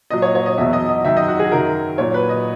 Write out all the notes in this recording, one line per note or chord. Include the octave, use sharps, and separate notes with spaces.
A#2 F#3 D#5
C#5
C#5
D#5
E2 B2 F#3 E5
D#5
D#5
F#2 D#3 F#3 E5
D#5
F#4
G#4
F#2 D#3 F#3 A#4
A#2 F#3 C#5
B4
D#5